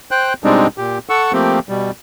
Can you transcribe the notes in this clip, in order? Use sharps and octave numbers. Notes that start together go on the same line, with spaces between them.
C5 G5 F#6
B2 G3 G#3 C4 D4 D#4
A#2 G4
A4 F#5 C#6 E6
F3 A3 A#3 C4 G4
B2 G3